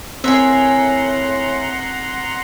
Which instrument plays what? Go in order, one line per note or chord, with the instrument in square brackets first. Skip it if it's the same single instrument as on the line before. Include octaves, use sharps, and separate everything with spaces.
[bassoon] A2 [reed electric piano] C4 [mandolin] G#4 A#4 E5 [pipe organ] F#5 A#5 C6